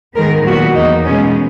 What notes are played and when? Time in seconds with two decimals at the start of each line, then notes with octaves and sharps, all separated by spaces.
0.15 G#2 D#3 G#3 B3 A#4
0.46 A#2 F#3 B3 F#4
0.75 E2 D#3 A#3 D#4
1.06 B2 G#3 B3 C#4